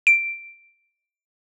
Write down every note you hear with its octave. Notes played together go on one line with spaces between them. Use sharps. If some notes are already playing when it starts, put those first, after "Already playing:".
D7